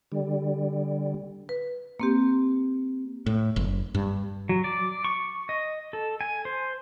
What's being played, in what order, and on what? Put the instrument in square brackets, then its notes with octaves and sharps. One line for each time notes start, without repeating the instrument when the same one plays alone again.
[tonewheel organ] D3 G3
[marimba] B4
A#3 C4 G4
[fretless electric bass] A2
F#1
G2
[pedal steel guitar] F#3
D5
C#6
D#5
A4
G#5
C5